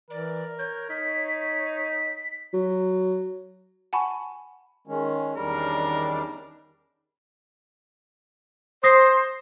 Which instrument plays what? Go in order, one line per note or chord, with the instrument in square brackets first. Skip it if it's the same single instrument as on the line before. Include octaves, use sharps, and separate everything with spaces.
[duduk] E3 [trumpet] A#4 [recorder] D5
[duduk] C#5 [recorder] G6
[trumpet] D#4 [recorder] B6
[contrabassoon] F#3
[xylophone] F#5 G#5 A5 B5 C#6
[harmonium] D#3 G#3 C#4
[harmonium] E2 C#4 [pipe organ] D#3 D4 [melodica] G3 [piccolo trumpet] A#4
[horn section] C5 [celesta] D#6 A#6 C7